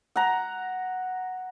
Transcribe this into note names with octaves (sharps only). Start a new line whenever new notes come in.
F#5 A#5